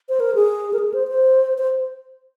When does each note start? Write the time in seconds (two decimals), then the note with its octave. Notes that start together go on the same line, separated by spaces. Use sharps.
0.09 C5
0.20 A#4
0.35 G#4
0.73 A#4
0.79 G#4
0.94 C5
1.08 C5
1.58 C5